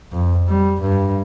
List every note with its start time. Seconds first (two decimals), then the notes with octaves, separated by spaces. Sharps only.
0.13 F2
0.48 G3
0.81 G2